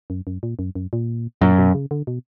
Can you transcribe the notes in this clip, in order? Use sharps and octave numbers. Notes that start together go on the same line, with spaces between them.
F#2
F#2
A#2
F#2
F#2
A#2
F#2 A#2
B2
C#3
D3
B2